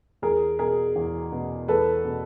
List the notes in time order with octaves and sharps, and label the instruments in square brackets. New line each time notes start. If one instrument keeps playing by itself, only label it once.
[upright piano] E2 G#4 A#4
B2 G#4 A#4
E2
B2
E2 A4 B4
B2